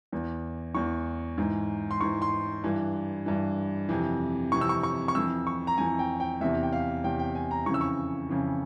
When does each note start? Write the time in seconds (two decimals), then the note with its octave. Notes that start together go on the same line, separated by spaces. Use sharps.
0.13 E2 E3
0.74 E2 E3 C#6
1.38 G#2 E3
1.91 C6
2.01 G#2 E3 C#6
2.22 C6
2.64 G2 E3
3.26 G2 E3
3.89 F2 C3 E3
4.52 F2 C3 E3 C#6
4.61 E6
4.69 C#6
4.83 C#6
5.08 C#6
5.15 F2 E3 E6
5.47 C#6
5.67 A#5
5.78 F2 E3 G#5
5.99 G5
6.20 G5
6.41 E2 C3 E3 E5
6.63 G5
6.73 F5
7.04 E2 C3 E3 G5
7.19 G5
7.35 G#5
7.51 A#5
7.66 F2 C#3 E3 C#6
7.74 E6
7.81 C#6
8.29 F2 C#3 E3